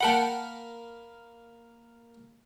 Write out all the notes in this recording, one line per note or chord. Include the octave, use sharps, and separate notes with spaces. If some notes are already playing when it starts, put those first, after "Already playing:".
A#3 A#4 F#5 G5 A5 B5